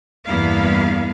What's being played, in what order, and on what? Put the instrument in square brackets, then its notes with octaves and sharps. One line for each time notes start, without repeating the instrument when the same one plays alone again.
[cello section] E2 G2 A#3 B3 E4 F5